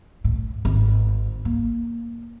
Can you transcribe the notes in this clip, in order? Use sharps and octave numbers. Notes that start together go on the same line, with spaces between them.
A2
G#1
A#3